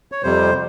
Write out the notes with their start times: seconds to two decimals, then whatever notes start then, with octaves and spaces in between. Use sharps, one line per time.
0.12 C#5
0.23 F2 C3 G3 C5